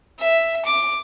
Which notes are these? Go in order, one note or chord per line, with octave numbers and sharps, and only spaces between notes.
E5
D6